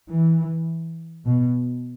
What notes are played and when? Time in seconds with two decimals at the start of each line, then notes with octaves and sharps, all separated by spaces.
0.10 E3
1.25 B2